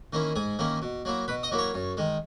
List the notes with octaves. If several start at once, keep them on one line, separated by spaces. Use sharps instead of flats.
D#3 A#3 C#4 E4
G#2 G#4 G#5
D#3 A#3 C#4 E4
B2
F#3 A#3 E4
B2 B4 B5
D#5 D#6
F#3 A#3 E4
C#5 C#6
F#2
D#3 G#3